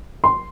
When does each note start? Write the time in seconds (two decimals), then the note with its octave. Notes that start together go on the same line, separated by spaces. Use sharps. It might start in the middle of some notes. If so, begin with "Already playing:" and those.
0.24 C6